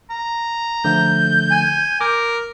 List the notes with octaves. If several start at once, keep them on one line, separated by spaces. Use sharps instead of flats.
A#5
D3 F3 A3 G6
G#5
A#4 D6